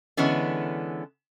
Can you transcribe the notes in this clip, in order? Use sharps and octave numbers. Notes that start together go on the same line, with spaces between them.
D3 E3 G#3 B3 C#4